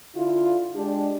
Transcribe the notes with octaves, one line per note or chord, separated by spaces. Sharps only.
D3 E4 F4
G#3 D4 G4